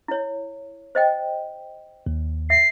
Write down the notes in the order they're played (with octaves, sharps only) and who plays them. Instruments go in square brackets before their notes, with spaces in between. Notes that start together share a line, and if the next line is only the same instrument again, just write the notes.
[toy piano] E4 C#5
C5 D#5 G5
[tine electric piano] D#2
[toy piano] E5 [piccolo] C7